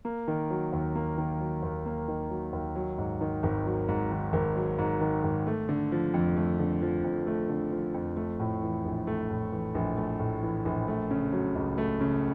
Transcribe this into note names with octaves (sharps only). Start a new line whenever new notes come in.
A#3
D#3
F#3
D#2
A#3
D#3
F#3
D#2
A#3
D#3
F#3
D#2
F#3
G#2
D#3
G#1
F#3
G#2
D#3
G#1
F#3
G#2
D#3
G#1
A3
D3
F3
F2
A3
D3
F3
F2
A3
D3
F3
F2
A3
A2
E3
A#1
A3
A2
E3
A#1
A3
A2
E3
A#1
A3
C#3
F#3
C#2
A3
C#3